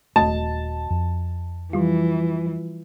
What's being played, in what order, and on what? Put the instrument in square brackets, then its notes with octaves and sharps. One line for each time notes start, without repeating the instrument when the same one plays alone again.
[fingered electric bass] D#1 C2 A3 [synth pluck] F#4 D#5 [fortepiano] A5
[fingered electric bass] F2
[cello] E3 [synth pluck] F3 G3 F4